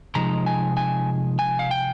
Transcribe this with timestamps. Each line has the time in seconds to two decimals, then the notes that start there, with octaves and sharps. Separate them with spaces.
0.15 C3 F3 G#3 D#4 A#5
0.46 G#5
0.77 G#5
1.39 G#5
1.59 F5
1.71 G5